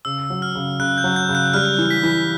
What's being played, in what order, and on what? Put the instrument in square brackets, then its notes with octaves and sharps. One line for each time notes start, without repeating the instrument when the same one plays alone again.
[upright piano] C#3 [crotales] E6
[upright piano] F#3
[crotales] F6
[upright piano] C#3
[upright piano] C#3 [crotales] F#6
[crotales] G6
[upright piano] F#3
[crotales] G6
[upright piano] C#3
[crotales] F#6
[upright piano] G3 [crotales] F6
[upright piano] E3
[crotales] B6
[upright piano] E3